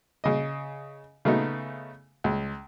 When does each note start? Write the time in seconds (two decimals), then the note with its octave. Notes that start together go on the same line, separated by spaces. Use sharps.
0.24 C#3 D#5
1.25 C#3 A3 B3 D#4
2.24 C#2